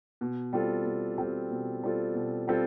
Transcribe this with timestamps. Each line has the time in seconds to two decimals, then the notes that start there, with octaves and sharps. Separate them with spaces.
0.21 B2
0.53 G3 C4 F4 A4
0.86 B2
1.18 G3 C4 F4 A4
1.51 B2
1.83 G3 C4 F4 A4
2.15 B2
2.48 G3 C4 F4 A4